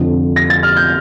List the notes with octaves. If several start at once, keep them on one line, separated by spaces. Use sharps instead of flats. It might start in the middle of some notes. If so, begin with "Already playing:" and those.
Already playing: F1 F2 D3
A#6
A6
F6
G6